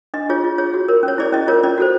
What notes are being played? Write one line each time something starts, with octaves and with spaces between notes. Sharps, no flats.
D4 D#5
F4 G#4 C#5
F4
G#4 C#5
F#4
A#4 C#5
C#4
C#5
E4 G#4 C#5 D5
C#4 D#5
F4 A#4 C#5
C#4 D5
F#4 A4 C5